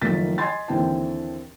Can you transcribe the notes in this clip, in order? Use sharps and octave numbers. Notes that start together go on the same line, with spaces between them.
F#1 D#3 F3 A3 A6 B6
D#5 G#5 C6 G#6 A6
D#2 D3 E3 C4 G5 A5